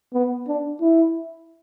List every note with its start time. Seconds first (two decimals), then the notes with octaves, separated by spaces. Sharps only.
0.14 B3
0.47 D4
0.81 E4